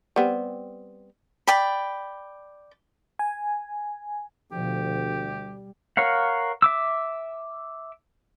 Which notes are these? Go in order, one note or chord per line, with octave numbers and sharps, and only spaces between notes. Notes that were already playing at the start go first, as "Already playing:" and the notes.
G3 B3 C4
D5 G5 B5
G#5
D2 B2 F3 G4
G3
A#4 C#5 F5 F#5
E5 D6 E6